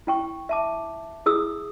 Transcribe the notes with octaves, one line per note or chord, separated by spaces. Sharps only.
E4 G5 C#6
E5 A5 D6
E4 G#4 D#6 E6